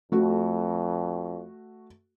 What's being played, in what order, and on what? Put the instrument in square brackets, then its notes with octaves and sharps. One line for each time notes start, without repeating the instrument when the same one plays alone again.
[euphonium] F2 [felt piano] A3 F#4